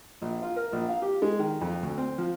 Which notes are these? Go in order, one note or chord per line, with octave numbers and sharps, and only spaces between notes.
A#1
F4
A#4
A#1
F5
G4
G#3
D#3
F2
D2
C4
F3